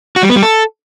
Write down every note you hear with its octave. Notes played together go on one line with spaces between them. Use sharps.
F#4
G3
B3
G3
A4